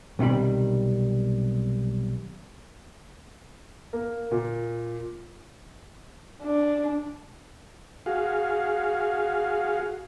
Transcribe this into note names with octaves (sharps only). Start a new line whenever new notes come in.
B1 C3 D#3 G3 B5
A#3
A#2
D4
F#4 G#4 F5